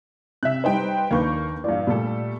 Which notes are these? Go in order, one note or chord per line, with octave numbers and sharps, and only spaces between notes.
C3 E5 F#6
G3 D#4 B4 C5 D#5 G5
D#2 A#3 D4 B4 C#6 G6
G2 A#2 E3 D5 F5
A#2 G3 A3 A4